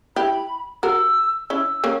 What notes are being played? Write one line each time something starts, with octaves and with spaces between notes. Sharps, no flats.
E4 G4 B5
F#4 A#4 E6
C#4 E4 E6
A#3 C#4